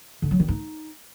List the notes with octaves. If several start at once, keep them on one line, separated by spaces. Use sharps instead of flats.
D3
F#3
D#3
D#4